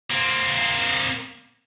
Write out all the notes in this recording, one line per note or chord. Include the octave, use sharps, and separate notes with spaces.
A#3 C4